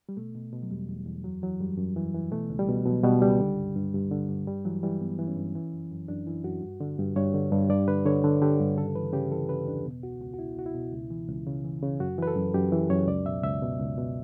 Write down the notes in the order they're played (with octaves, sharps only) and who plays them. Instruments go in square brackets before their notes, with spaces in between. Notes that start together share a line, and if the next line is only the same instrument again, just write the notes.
[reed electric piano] G3
B2 A3
B2
B2
F#3
E2 G3
E2
E2
F#2 F#3
E3 F#3
F#2 G3
F#2
E3
E3
B2 A3
C#2
G3
B2
B2 F#3
B2 G3
C#2 G3
D3
G2
G2
G2
D3
G2
G2 G3
E3 F#3
E3 G3
G2 B3
E3
C#4
G2
E3
F#2
F#2
F#2 D4
E3 E4
F#2 F#4
G2
D3
G2
G2 C#5
D3
G2
G2 D5
D3 B4
D3 C#5
D3
D3 G4
G2
C#3 A4
E3 B4
C#3 G4
E3 A4
C#3 B4
E2 D4
B2 B3
C#2 F#4
C#2 F#4
F#4
C#2 E4
C#2 F#4
E4
B2
C#2
E3
C#2
C#3
E3
C#3
F#2 F#4
E3 B4
A4
F#2
F#2 G4
E3
F#2 C#5
C#2 D5
B2 E5
C#2 E5
B2
C#2
B2